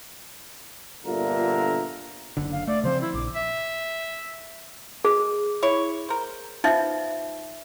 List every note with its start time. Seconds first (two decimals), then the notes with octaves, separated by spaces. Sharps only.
1.05 G1 A#2 D3 F4 A#4 E5
2.37 F#1 D3
2.52 F5
2.67 A3 D5
2.84 C#3 F3 C4 C5
3.01 E4
3.14 A#1 D6
3.35 E5
5.05 G#3 G#4
5.63 E4 C#5
6.09 A#4 C5
6.64 F3 B3 D#4 E5